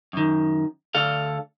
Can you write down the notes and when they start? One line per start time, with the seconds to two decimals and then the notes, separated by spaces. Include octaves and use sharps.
0.13 F#2 D#3
0.95 D2 D3 A4 F5